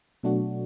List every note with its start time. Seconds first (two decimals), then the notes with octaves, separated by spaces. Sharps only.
0.23 B2 F#3 A3 D4 F#4